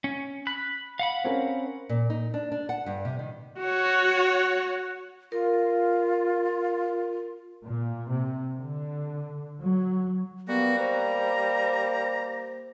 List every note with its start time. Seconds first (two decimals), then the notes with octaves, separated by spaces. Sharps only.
0.04 C#4
0.47 B5 F#6
0.99 F5 F#5 B5
1.24 C4 C#4 A#4
1.89 A#2
2.10 D#4
2.34 D4
2.52 D4
2.69 F#5
2.86 G2
3.05 C3
3.19 D#3
3.61 F#4 C#5
5.32 F4 A#4
7.66 A#2
8.11 C3
8.56 D3
9.61 F#3
10.48 G3 A#3 B3 F#4
10.78 C5 A#5